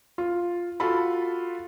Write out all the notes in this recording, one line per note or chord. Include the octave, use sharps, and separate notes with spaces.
F4
F4 F#4 A4 B5